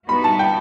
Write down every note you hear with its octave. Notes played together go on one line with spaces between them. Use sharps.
G3 B3 D#4 F#4 B5
A5
G5